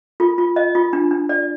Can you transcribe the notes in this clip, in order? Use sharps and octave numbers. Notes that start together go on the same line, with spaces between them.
F4
F4
D#5
F4
D4
D4
D5